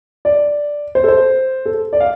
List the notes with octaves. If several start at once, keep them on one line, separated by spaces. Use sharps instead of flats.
D5
C5
A4
C5
A4
D5
F5